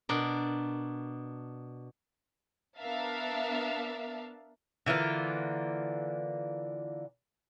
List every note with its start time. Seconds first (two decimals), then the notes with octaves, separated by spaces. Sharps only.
0.09 B2 D4 A#4
2.79 B3 D4 A#4 E5 F5 A5
4.86 D3 E3 A#3 F4